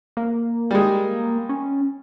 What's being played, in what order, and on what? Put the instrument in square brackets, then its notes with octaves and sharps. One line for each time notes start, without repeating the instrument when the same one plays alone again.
[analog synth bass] A#3
[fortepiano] G3 G#3
[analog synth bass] C#4